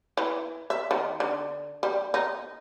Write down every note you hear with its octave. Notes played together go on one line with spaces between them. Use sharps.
E3
E5
D#3
D3
G3
D#4